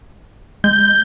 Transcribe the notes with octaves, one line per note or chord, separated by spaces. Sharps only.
G#3 G6